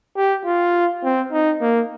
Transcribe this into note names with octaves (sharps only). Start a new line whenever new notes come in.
G4
F4
C4
D#4
A#3